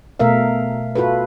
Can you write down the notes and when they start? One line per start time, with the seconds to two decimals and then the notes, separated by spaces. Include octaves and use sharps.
0.19 B2 A3 A#4 E5 F5
0.95 F4 F#4 A4 B4